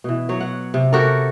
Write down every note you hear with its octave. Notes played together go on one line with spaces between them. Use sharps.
B2 E3
F#3 C#5
F#5
C3
F#4 G4 A4 A#4